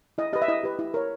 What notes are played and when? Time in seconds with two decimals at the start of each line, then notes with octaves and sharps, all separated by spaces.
0.18 E4 D#5
0.33 G4 B4 D#5
0.42 E5
0.48 E4 D#5
0.64 G4 B4
0.79 E4
0.94 A#4 C#5